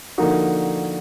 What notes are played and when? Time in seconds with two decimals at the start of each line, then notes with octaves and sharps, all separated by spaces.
0.18 D3 F3 A#3 D#4 F#4